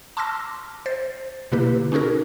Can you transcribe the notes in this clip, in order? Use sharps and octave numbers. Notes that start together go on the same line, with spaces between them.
A5 C6 D6 E6 F6 A#6
C5 A6
B2 D3 A#3 E4 G4 B4
C#4 D#4 F#4 G#4 A#4